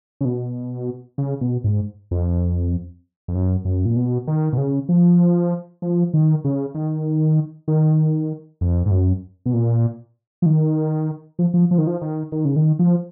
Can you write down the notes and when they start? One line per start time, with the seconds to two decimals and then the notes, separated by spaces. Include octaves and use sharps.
0.21 C#3
0.25 B2
1.18 C#3
1.41 B2
1.64 G#2
2.11 F2
3.28 F2
3.35 F#2
3.65 F#2
3.85 A#2
3.96 B2
4.27 D#3
4.53 B2
4.58 C#3
4.89 F3
5.82 F3
6.14 D#3
6.45 C#3
6.75 D#3
7.68 D#3
8.61 F2
8.86 G#2
8.91 F#2
9.46 B2
9.54 A#2
10.42 F3
10.46 D#3
11.39 F3
11.54 F3
11.71 F3
11.78 D#3
11.87 F3
12.01 D#3
12.32 D#3
12.45 C#3
12.56 D#3
12.79 F3